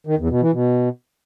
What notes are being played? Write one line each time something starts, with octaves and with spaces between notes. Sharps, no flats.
D#3
E2
B2
E3
B2